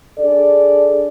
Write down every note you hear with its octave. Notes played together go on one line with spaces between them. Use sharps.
D4 G#4 A4 D5